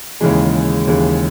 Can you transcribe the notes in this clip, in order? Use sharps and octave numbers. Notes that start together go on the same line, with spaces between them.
D#2 C#3 E3 G#3
D#2 C#3 E3 G#3